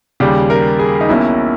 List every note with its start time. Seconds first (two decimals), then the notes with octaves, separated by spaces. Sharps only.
0.20 D#2 C#3 G3 G4
0.50 A#4
0.79 G#4
1.01 D#4
1.09 B1 B2 A#3 C#4 E4